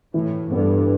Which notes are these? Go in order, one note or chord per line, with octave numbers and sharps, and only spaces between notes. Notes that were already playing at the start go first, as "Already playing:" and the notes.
A2 E3
G2 B3 D4 A4